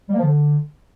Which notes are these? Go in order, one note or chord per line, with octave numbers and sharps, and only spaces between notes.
G3
A#3
F3
D3